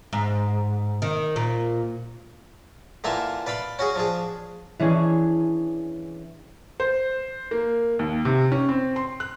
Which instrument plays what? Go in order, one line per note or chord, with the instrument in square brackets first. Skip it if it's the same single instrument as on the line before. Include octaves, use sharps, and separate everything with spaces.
[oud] G#2
D#3
A#2
[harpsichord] D3 E3 A#3 F4 E5
B4 D5 F5 B5 C6
C#4 F#4 G#4
F3 D4 G#4
[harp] E3 C#4 D4 G#4 C#5 G#5
[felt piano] C5
A#3
D#2
C3
C#4
C4
C6
F#6